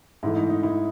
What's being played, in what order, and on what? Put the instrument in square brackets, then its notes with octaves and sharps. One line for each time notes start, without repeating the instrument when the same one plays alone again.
[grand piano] G#2 E3 A3 E4
D#4
D#4
E4